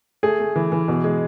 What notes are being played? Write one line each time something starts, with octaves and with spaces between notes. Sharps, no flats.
A3 G#4
A3
E3
E3
B2
G#3